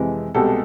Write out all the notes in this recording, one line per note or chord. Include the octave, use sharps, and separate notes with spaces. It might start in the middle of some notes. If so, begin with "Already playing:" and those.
Already playing: F2 C3 E3 G#3
C2 B2 G#3 G4 A4